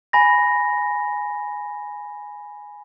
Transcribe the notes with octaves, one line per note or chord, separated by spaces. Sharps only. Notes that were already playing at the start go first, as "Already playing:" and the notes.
G#5 B5 A#6